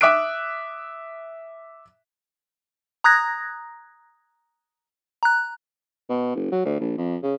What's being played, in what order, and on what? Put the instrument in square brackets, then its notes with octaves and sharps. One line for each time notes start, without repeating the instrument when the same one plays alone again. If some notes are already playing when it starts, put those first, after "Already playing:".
[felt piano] E5 D6 D#6 F#6 D7
[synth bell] A#5 D#6 F#6 G#6 A#6
A#5 F#6
[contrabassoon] B2
F#1
F#3
D2
A#1
F2
C#3